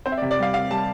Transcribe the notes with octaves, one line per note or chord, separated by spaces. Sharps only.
C4 C5
E5
D5
C3
D5
G3 F5
C4 F5
G3 A5